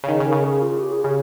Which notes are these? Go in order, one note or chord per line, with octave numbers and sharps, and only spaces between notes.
C#3
D#3 G#4
C#3
A#4
C#3
G#4
F4
G4
G#4
C#3 G#4